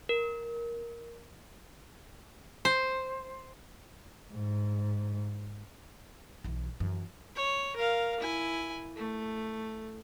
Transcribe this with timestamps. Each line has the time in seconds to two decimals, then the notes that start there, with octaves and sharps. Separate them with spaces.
0.09 A#4
2.65 C5
4.32 G#2
6.44 B1 E3
6.80 F#2 E3
7.35 C#5
7.76 A#4 F5
8.20 E4 G#5
8.96 A3